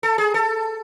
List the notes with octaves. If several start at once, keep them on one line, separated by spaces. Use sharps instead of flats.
A4
G#4
A4